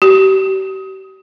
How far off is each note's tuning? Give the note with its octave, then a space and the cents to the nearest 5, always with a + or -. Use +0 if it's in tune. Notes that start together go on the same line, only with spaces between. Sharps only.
G4 -35